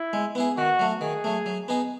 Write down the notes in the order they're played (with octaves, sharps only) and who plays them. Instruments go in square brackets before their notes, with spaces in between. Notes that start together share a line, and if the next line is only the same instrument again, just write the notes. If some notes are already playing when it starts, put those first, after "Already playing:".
Already playing: [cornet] E4
[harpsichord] G#3
B3 E4 G#4
[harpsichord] D#3 [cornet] F#4
[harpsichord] F#3 A3
[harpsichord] D#3 [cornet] G#4
[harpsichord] F#3 A3
F#3
B3 D#4 G#4